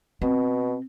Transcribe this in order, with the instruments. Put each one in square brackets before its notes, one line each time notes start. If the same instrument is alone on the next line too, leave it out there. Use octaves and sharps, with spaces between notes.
[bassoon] B2 [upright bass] C4